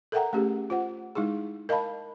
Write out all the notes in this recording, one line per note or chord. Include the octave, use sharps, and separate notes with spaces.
A4 A#4 E5 F#5 G5 A#5
A3 C#4 G4 G#4
F4 C5 F#5
G#3 D#4 E4 G#4
A#4 D#5 F5 A5 B5